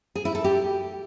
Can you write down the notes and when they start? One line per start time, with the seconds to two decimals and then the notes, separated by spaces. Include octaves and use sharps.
0.15 G#4
0.25 E4
0.35 A4
0.44 G4